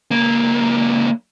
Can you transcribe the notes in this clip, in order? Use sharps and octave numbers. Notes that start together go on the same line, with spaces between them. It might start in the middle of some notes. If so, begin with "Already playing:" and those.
C#2 A#3